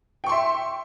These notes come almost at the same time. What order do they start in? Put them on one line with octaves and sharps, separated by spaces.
G5 C#6 C6 E5